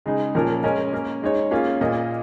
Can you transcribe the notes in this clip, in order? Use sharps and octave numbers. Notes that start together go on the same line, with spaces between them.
C#3 G#3 D#4 G#4
A#2 F3 C#4 A#4
G#3 C#4 A#4 D#5
A#3 C#4 A#4
G#3 D#4 G#4 C#5
A#3 C#4 F4 G#4
A#2 A#3 F4 G#4 D#5